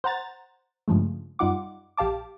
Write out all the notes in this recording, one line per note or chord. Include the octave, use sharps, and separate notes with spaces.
C5 F#5 A#5 A6
G2 C#3 F3 G#3 A3
F#2 G3 D#4 F4 F#5 D6
A#1 G4 F5 A5 D6